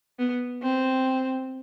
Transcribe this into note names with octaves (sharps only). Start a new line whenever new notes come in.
B3
C4